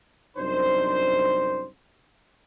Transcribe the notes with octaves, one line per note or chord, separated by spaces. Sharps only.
C2 F#2 D4 D#4 C5